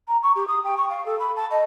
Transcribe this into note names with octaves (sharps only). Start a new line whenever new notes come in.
A#5
C#6
G4
D#6
G5
C#6
F5
A4
B5
A5
D#5